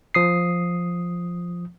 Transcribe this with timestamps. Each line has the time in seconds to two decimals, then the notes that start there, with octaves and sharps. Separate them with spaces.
0.14 F3 D#6 C7